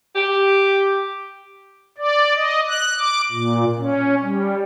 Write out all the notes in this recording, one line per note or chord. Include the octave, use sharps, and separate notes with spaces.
G4
D5
D#5
F#6
D6
A#2
C#4
G3